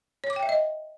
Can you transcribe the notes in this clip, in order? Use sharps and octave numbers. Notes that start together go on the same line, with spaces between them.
C#5
D6
G5
E5
D#5